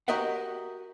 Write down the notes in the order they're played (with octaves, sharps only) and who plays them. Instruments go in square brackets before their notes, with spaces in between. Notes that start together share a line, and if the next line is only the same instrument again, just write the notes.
[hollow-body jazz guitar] F#4 G4 A#4 D#5 E5 F#5